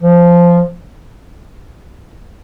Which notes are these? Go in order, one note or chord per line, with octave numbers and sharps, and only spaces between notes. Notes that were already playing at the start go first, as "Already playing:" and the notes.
F3